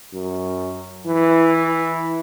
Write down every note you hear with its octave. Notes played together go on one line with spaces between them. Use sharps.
F#2
E3